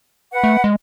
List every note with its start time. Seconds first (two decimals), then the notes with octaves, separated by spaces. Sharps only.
0.32 B4 F#5
0.44 A3
0.64 G#3